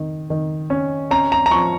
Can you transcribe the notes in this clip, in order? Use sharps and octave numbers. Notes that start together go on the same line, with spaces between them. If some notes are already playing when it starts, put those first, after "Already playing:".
Already playing: D#3
D#3
C#4
C#4 A#5
A#5
A#5
F3 C#6